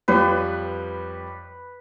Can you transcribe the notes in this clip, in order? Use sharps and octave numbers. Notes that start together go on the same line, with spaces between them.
F2 G3 B4 C#5